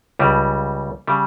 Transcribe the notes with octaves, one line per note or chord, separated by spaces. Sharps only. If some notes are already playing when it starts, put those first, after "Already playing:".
C#2 C#3 G3
C#3 G3